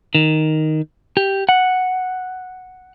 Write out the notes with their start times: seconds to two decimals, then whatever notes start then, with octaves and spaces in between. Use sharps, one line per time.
0.15 D#3
1.17 G4
1.49 F#5